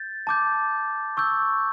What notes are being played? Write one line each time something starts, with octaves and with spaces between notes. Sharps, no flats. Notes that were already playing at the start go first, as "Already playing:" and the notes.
Already playing: G6 A6
A5 D6 G6
C#6 E6 G6